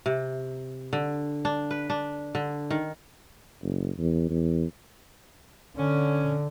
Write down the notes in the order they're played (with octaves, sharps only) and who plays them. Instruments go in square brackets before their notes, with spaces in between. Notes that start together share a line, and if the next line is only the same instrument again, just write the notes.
[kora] C3
D3
D4
B4
D4
D3
D#3
[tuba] F#1
E2
E2
[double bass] D3 [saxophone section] C#4